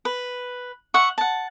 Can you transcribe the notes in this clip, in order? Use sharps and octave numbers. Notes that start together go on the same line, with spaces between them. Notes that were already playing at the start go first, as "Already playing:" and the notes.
B4
E5 F#5 C#6
F#5 A5